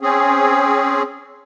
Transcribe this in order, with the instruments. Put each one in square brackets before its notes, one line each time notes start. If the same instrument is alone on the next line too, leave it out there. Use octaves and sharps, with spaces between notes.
[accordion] C4 C#4 G#4